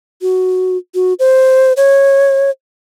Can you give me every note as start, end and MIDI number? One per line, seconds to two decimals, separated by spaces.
0.22 0.77 66
0.95 1.14 66
1.19 1.73 72
1.77 2.50 73